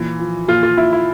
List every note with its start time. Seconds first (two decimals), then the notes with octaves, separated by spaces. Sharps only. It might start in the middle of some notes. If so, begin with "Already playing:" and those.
Already playing: A#2 E3
0.20 F3
0.48 A#2 F4
0.63 F4
0.77 A#2 E4
0.93 E4